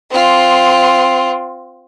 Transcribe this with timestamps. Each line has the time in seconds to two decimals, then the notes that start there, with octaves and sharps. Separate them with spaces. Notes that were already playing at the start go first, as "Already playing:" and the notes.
0.11 C4 F4